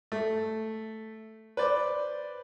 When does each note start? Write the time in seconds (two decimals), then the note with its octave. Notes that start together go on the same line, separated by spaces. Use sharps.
0.12 A3
1.57 B4 C5 D5